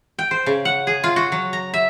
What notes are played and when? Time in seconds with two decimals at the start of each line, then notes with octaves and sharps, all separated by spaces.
0.19 G5
0.31 C5
0.46 C#3
0.65 F#5
0.87 G#4
1.04 F4
1.16 F#4
1.32 F#3
1.53 A#5
1.74 E5